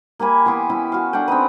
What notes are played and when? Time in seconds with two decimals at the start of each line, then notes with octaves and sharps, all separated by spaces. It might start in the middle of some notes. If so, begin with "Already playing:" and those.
0.19 A#3 G4 G#5 B5
0.46 E3 B3 C6 D6
0.69 B3 C#4 E4
0.92 F#4 F5
1.13 D4 A4 F#5 G5
1.28 C4 C#4 D#4 B4